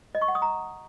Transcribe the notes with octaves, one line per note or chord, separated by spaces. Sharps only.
D#5
C#6
F#5
D#6
A#5